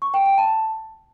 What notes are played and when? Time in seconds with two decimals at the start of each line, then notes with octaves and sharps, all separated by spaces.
0.02 C#6
0.14 G5
0.26 G5
0.38 A5